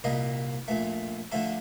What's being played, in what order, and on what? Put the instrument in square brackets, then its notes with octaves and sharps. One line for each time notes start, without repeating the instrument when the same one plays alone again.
[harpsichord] C2 A#2 G3 A#3 D#5
A#1 A#2 A3
D3 F3 A3 A4